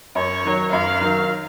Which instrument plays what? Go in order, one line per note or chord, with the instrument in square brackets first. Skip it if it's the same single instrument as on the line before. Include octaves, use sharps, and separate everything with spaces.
[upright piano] F#2 [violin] C#5
[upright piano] D#3 F#3
[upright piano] F#2 [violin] F5
[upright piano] D#3 F#3